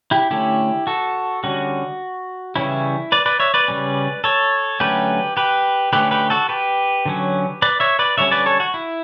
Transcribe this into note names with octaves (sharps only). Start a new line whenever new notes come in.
E4 G4
D3 A3 C#4 E4 G4
F#4 A4
D3 G3 C#4 F#4
C#3 E3 G3 C#4 E4
B4 D5
B4 D5
C#5 E5
B4 D5
C#3 G3 C#4
A4 C#5
D3 F#3 A3 C#4 G4 B4
G4 B4
D3 A3 C#4 G4 B4
G4 B4
F#4 A4
G4 B4
D3 F#3 C#4
B4 D5
C#5 E5
B4 D5
D3 G3 C#4 C#5 E5
B4 D5
A4 C#5
F#4
E4